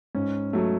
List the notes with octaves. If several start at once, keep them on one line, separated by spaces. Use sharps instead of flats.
G#2 C#4
F#3 A3